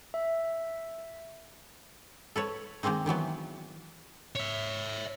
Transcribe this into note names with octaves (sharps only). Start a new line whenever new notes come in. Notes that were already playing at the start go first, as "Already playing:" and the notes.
E5
A4 B4 C#5
D#3 G#3 A#3 C4 D#4
D#3 E3 F#3 B3
C#5 E5